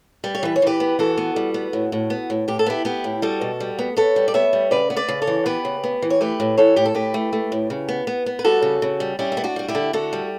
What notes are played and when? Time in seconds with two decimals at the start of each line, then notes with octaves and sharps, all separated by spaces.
0.24 G3 B4
0.35 C#5
0.43 E3 B4
0.56 C#5
0.62 E3 G4 B4
0.80 B3
0.99 E3 F#4 A4
1.17 B3
1.36 G3
1.54 B3
1.73 A2
1.92 A2
2.10 B3
2.30 A2
2.48 A2 G4
2.59 A4
2.66 B3 E4 G4
2.85 B3 E4 G4
3.04 A2
3.22 G3 F#4 A4
3.41 B2
3.60 G3
3.79 B3
3.96 B3 A4 C#5
4.16 G3
4.28 D5
4.34 B3 C#5 E5
4.53 G3
4.71 C#3 B4 D5
4.90 B3
4.96 B4 D5
5.08 C#3
5.22 A4 C#5
5.27 E3
5.46 B3 G4 B4
5.65 C#3
5.84 B3
6.02 E3
6.10 C#5
6.21 A3 G4 B4
6.40 A2
6.57 E3 A4 C#5
6.76 A2 G4
6.85 A4
6.94 A2 G4 B4
7.14 A3
7.33 A3
7.52 A2
7.70 C#3
7.89 B3
8.07 B3
8.26 B3
8.39 B4
8.44 G3 F#4 A4
8.62 C#3
8.82 C#3
9.00 G3
9.19 G3 C#4 E4
9.32 E4
9.37 B3
9.44 D4 F#4
9.56 G3 F#4
9.68 E4 G4
9.75 D3
9.93 D3 F#4 A4
10.13 G3